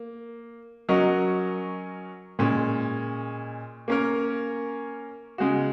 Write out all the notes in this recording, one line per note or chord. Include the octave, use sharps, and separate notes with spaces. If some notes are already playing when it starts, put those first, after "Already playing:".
Already playing: A#3
F#3 C#4 F#4 A#4 D#5
A#2 G#3 C#4
A#3 C#4 A#4
C#3 G#3 F#4